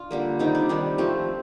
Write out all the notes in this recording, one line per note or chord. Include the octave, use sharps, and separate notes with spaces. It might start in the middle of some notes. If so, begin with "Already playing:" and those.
Already playing: D4 F4
D3 G3 A#3
C3 D#3 G3 D#4
D4
C3 D#3 G3
C3 F3 A3 C4